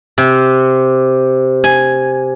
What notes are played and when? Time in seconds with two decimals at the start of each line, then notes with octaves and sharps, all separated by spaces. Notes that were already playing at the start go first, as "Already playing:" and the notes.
0.18 C3
1.64 G#5